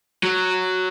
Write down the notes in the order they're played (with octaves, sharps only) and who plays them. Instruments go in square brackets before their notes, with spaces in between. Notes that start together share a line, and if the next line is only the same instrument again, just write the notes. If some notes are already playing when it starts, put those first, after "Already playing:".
[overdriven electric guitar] F#3